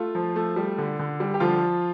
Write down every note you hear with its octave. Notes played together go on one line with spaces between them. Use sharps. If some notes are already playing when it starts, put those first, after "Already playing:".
Already playing: A3 F4
F3
A3
G3
D3
D3
G3
G4
D3 F3 F4